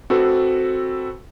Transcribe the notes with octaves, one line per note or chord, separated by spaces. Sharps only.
C4 F#4 A4 B4